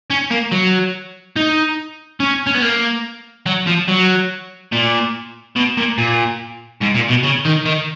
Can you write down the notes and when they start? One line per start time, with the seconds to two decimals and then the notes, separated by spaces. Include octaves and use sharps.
0.11 C#4
0.31 A#3
0.52 F#3
1.36 D#4
2.20 C#4
2.47 C#4
2.55 B3
2.62 A#3
3.46 F#3
3.67 F3
3.88 F#3
4.73 A#2
5.56 B2
5.77 A#2
5.98 A#2
6.83 G#2
6.96 A#2
7.10 B2
7.24 C#3
7.46 D#3
7.66 D#3